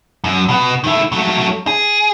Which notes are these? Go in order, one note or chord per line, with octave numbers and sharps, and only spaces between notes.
F#2
B2 B3
D#3 E4
F#3 A3
G#4